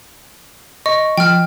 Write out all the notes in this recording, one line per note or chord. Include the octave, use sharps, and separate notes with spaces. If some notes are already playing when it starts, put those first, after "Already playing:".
D#5 C#6
F3 G5 F6